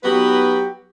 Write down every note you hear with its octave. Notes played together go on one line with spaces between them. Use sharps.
F#3 B3 D#4 F#4 G4 B4